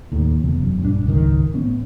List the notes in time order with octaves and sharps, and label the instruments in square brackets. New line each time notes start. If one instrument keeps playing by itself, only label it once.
[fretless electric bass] D#2 A2
F1 E2 C#3
F#2
A#1 G2 D3 D4
F#1 C#2 G#2 D#3
A1 B3 C#4